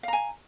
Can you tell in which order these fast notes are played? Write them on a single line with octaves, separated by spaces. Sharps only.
F5 A#5 G#5